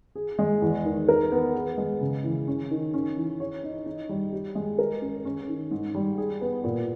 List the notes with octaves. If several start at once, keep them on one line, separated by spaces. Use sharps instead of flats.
G#4
G#3
E2
D#3
A#4
B3
G#4
G#3
C#3
E3
C#4
D#3
C#4
E3
C#5
D#4
D#4
G3
G4
G#3
A#4
C#4
C#4
D#3
G#2
G3
G#4
B3
A#2